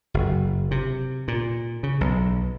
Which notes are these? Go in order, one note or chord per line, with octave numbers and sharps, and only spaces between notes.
F#1
C3
A#2
C#3
B1